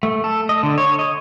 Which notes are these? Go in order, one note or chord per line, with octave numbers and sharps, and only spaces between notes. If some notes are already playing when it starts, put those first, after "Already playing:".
A3
A4
D#5
D3
C#5
D#5